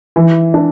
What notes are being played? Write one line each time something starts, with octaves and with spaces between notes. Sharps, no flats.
E3
D4